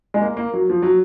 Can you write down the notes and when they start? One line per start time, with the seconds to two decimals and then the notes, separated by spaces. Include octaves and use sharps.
0.14 G#3
0.21 A#3
0.37 A#3
0.53 F#3
0.70 F3
0.82 F#3